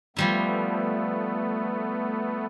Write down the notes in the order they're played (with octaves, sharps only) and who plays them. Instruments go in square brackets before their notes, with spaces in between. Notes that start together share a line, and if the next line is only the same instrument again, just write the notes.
[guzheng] F3 G3 E4 [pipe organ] A3 B3